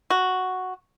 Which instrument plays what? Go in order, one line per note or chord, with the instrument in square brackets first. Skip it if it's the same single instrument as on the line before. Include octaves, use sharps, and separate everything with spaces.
[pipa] F#4